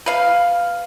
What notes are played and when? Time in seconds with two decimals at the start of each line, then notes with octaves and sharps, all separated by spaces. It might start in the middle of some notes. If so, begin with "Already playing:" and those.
0.06 B4 F5